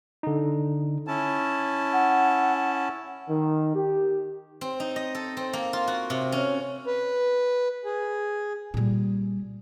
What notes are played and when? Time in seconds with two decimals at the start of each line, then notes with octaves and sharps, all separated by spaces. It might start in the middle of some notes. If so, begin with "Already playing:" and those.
0.23 D3 D#4
1.07 C#4 E4 A5
1.93 F#5
3.29 D#3
3.75 G4
4.61 C4
4.80 D#4
4.96 D#5
5.15 A4
5.37 C4
5.53 A#3
5.73 F4
5.87 F#4
6.10 C3
6.32 C#4
6.87 B4
7.85 G#4
8.74 A#2 G3